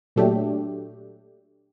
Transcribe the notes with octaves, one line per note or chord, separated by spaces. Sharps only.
A#2 F#3 A3 D4 G4